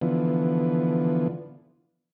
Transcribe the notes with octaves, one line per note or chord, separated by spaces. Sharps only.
D3 E3 F3 B3